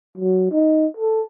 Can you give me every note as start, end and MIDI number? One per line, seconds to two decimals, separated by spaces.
0.18 0.50 54
0.51 0.86 63
0.97 1.23 69